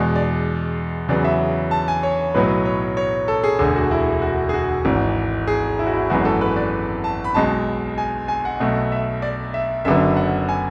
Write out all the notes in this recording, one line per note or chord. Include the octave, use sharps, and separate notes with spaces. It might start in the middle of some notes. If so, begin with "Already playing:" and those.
Already playing: E2 B2 G#3 D5
D5
E2 C#3 F#3 B3 D5
E5
A5
G#5
C#5
B1 A2 F#3 B3 B4
C#5
C#5
A4
G#4
E1 D2 D3 G#4
F#4
E4
F#4
G#4
F#4
G#1 G#2 E3
G#4
E4
F#4
E4
G#1 F#2 E3 G#3 B3 F#4
A4
B4
D5
A5
B5
B1 B2 G#3 A5
G#5
G#5
F#5
B1 B2 A3
E5
D5
E5
F#1 F#2 D3 F#3 B3 E5
F#5
G#5